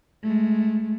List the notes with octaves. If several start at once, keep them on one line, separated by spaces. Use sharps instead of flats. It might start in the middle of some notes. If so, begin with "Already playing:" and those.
G#3 A3